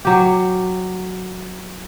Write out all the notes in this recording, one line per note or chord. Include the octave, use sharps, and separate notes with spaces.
F#3 G4